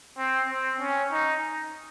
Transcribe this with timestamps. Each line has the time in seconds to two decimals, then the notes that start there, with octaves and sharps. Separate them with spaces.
0.18 C4
0.49 C4
0.80 C#4
1.12 D#4